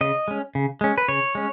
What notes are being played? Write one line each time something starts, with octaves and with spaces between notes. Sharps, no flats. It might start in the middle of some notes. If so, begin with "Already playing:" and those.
C#3 D#5
G#3 C#4
C#3
G#3 C#4
B4
C#3 C#5
G#3 C#4